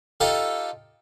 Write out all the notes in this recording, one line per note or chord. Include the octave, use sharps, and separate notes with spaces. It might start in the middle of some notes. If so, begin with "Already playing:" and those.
D#4 F4 G4 A4